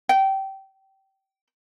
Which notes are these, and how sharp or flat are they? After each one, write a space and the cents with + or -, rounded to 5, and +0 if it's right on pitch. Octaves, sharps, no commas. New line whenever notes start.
G5 -20